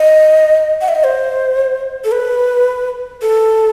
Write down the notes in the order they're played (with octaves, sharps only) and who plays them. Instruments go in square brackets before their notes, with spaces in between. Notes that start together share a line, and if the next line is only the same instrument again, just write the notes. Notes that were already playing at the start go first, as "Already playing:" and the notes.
Already playing: [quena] D#5
F#5
E5
D#5
C5
A4
B4
A4